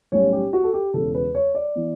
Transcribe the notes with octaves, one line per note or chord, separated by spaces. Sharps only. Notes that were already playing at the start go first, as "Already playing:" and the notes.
B1 A2 G3 C#4 C#5
G4
F#4
A4
G4
E1 E2 C#3 A4
B4
C#5
D5
E3 B3